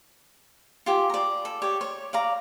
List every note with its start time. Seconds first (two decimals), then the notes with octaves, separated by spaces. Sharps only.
0.86 F4 G4 G#5
1.10 D5 A#5
1.45 A4
1.62 G4 C#5 D5
1.81 C#5
2.13 D5 F5 A#5